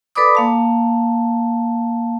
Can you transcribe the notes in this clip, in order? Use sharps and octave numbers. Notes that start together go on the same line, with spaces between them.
A4 B4 D5 B5 D6 D#6
A#3 F5 A5